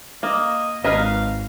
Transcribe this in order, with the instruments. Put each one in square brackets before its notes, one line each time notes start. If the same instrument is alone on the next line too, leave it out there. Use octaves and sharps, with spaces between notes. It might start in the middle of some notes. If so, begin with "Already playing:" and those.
[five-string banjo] A#3 [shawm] D#5
[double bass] G#1 [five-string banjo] A#4 B4 D#5 [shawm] F5